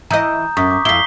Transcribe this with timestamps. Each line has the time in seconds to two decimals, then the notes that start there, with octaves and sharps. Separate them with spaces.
0.11 E3 D#5 A#5 D#6 G6
0.57 F#2 C#6 D#6 B6
0.71 D6
0.85 F2 E4 B6 C7 G7